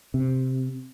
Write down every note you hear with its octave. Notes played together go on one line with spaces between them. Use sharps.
C3